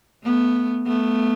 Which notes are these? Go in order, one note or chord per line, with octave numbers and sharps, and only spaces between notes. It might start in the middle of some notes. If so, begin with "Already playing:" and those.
A3 B3
A3 B3